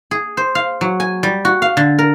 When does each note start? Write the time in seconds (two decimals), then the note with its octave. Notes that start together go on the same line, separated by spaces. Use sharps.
0.11 G#4
0.37 C5
0.55 F5
0.81 F#3
1.00 G#5
1.23 G3
1.45 F#4
1.62 F5
1.77 D3
1.99 A#4